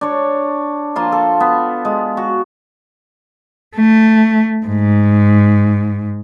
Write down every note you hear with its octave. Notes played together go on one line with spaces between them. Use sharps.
D4 C#5
F3 A#3 F4 C6
A4
B3
G#3
F#4
A3
G#2